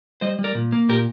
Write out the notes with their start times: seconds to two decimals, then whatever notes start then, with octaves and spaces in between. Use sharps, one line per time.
0.21 G3 C5 D#5
0.39 G3
0.44 A#4 D5
0.55 A#2
0.72 A#3
0.89 A#2 G4 A#4